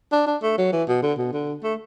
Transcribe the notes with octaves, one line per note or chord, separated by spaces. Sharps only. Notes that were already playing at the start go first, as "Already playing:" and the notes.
D4
D4
A3
F#3
E3
B2
D3
B2
D3
A3